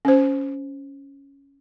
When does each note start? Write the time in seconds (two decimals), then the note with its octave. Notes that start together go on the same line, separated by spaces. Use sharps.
0.05 C#4 C5